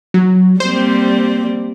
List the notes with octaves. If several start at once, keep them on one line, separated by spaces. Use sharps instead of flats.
F#3
G3 A#3 C4 C5